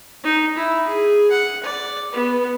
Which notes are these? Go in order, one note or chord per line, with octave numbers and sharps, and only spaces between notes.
D#4
E4
G#4
F#5
D5
B3